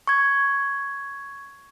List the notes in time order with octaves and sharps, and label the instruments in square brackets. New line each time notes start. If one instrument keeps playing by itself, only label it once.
[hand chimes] C#6 G#6